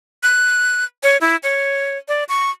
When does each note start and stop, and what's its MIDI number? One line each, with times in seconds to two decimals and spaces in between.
0.23 0.85 90
1.03 1.17 73
1.21 1.36 64
1.43 1.98 73
2.08 2.24 74
2.29 2.50 85